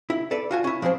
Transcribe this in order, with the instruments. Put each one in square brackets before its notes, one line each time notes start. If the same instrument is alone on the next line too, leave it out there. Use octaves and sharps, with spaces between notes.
[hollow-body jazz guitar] E4
A4 B4 D5
F4 F#4 G#5
C#4 E4
F3 F#3 C4 G#4 C5